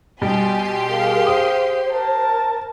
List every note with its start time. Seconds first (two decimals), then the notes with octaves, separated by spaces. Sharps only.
0.21 B2 G3 G4 G#5 C6
0.89 G#4 A#4 F5
1.27 C5 D#6
1.93 A#4 A5